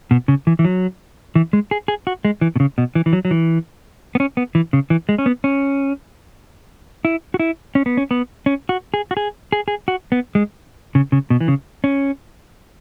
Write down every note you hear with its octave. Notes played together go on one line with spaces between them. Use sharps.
B2
C#3
E3
E3
F#3
E3
G#3
G#4
G#4
F#4
G#3
E3
B2
C#3
B2
E3
E3
F#3
F#3
E3
B3
C#4
B3
E3
C#3
E3
G#3
C#4
B3
C#4
E4
F#4
E4
C#4
B3
C#4
B3
C#4
F#4
G#4
F#4
G#4
G#4
G#4
F#4
B3
G#3
C#3
C#3
B2
E3
C#3
C#4